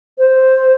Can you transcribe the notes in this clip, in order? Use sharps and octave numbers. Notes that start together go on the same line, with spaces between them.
C5